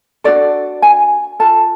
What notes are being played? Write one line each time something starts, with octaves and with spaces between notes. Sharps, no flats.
D4 F#4 A4 D5
G#5
F4 A4 A5